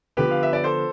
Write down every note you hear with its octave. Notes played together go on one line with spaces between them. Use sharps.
D3 F3 B3 G4 B4
F5
E5
D5
A4 C5